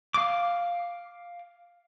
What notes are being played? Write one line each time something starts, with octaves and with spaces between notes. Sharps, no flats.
F5 D6